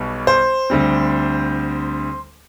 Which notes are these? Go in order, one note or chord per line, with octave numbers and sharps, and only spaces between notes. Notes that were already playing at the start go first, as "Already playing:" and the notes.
Already playing: B1 B2 G3
C5
D2 D3 G3 C4